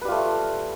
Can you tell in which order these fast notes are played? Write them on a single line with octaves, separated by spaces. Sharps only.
B4 G3 F4 A3